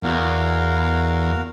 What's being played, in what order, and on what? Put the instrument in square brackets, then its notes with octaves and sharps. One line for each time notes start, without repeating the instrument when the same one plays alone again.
[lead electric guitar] E2 [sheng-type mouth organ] F#4 A#4 F5